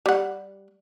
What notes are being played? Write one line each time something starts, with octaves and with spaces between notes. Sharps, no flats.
G3 F#5